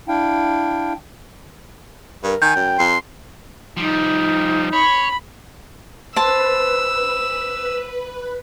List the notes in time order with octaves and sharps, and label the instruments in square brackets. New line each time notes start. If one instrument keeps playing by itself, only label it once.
[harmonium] D4 E4 F5 G5
[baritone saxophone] G2 [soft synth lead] A#4
[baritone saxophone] D#3 [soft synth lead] G#5 [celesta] G6
[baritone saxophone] F#2 [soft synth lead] G5
[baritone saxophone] F2 [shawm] C6
[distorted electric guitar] F3 G3 [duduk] D#4
[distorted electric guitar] C#5 [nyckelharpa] B5
[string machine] B4 [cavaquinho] C5 A5 [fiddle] E6